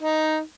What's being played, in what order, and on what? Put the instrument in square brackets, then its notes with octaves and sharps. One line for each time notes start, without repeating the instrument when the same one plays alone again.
[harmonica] D#4